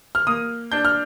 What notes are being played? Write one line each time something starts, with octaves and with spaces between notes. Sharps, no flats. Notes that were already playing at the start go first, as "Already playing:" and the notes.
F6
A#3 D#6
D4 G6
F6